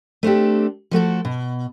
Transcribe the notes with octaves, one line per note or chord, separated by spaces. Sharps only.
A3 C4 D4 G4
F3 A3 F#4 A4
B2